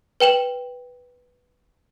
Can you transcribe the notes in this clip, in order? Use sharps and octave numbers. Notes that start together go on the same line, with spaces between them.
B4 G5 E7 F#7